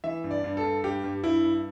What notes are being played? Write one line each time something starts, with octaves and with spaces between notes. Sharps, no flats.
E3 E5
G2
D5
G2
A4
G2
G2 G4
G2
G2 E4
G2